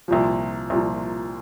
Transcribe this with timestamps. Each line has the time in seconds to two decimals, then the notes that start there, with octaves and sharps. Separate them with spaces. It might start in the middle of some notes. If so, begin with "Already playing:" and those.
0.08 C2 A#2 F3
0.70 C2 A#2 F3